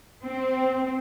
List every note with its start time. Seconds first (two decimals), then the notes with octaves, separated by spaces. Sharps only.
0.25 C4